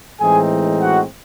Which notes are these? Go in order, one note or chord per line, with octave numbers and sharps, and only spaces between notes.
A2 E3 G#3 C4 D#4 G#4 G#5
F#4 F#5